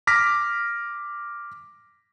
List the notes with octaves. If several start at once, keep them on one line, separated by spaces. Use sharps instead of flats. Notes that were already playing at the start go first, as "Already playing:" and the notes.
D6 F6 A#6 B6